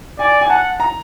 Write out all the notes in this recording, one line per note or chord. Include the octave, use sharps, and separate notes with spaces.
D5 G#5
G#5
F#5 A5
A#5